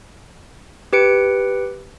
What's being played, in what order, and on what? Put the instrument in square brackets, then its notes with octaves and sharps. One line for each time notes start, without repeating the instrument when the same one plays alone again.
[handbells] G4 B4 C#7 D7